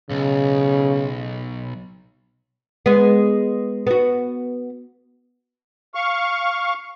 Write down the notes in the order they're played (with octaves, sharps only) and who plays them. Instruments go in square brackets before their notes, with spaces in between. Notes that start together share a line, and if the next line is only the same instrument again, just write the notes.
[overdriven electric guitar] B1 [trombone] C#3
[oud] G#3 B3
B3 F#4
[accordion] F5 C#6